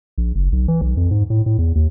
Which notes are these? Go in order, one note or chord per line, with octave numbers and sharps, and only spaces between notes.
A#1
F#1
B1
E3
B1
F2
G#2
A2
A2
E2
D#2